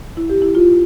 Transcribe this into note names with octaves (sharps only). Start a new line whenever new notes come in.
E4
G4
E4
F4